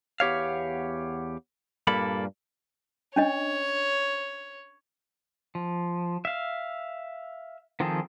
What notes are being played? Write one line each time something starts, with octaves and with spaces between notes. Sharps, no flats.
E2 B3 G4 C#5 F5
G2 A#2 G3 A#3 A4 B5
C#4 D4 C#5 D#5
F3
E5 F5
D#3 F3 C4 G#4 A4